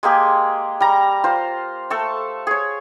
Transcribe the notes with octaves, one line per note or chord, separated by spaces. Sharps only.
G#3 A#3 G4 G#4
G3 A#5
F4 C5
A3 A4 A5
G#4 C#5